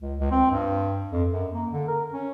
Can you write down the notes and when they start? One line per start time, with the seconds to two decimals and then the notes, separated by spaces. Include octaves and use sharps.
0.01 C#2
0.19 C#2
0.31 C4
0.51 G2
1.12 F2
1.31 F#2
1.53 A#3
1.72 D3
1.88 A#4
2.12 C#4